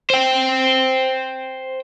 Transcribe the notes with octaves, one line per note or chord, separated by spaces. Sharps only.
C5 G5